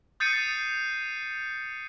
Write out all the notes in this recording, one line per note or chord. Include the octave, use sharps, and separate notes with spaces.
D#6 G6 A6 C7 C#7 D#7